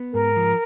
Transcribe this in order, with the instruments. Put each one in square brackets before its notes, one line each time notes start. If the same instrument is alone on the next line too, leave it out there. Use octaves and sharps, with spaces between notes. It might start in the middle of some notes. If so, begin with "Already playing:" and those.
Already playing: [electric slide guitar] B3
[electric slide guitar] G#2 [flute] A#4
[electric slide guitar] F3